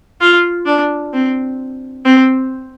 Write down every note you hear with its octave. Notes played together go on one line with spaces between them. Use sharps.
F4
D4
C4
C4